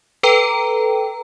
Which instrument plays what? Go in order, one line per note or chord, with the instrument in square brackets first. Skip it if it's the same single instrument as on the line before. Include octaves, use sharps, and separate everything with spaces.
[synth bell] A4 B4 G5 A#5